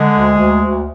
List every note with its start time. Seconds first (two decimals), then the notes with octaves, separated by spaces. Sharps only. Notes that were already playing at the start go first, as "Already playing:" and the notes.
Already playing: D3 G#3
0.13 D2
0.37 D2
0.62 D2